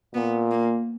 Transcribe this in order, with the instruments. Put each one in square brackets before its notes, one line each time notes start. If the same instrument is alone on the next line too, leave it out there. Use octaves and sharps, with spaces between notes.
[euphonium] A#2 [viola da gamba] B3
[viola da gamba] A#3